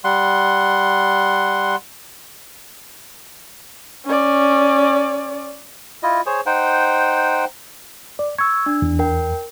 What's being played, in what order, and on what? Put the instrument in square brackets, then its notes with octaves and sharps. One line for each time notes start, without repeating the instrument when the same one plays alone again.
[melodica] G3 F#5 C6
[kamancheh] C#4 D5
[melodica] E4 F4 D#5
G#4 C5 C#5
D#4 C5 F#5 G5
[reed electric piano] D5
[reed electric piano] C#6 [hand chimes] E6 G#6
[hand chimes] D4
[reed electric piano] E2
[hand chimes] A#4 G5